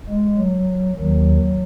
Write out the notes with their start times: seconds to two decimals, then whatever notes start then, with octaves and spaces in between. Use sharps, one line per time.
0.09 G#3
0.38 F#3
0.97 D#2 D#3 F#3